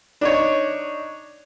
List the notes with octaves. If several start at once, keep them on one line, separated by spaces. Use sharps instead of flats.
D4 D#4 C#5